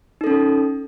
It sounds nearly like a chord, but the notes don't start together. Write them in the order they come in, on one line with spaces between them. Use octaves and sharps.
D#4 A4 C#4